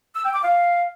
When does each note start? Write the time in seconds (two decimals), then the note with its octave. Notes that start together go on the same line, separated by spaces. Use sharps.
0.15 E6
0.25 G5
0.34 D6
0.43 F5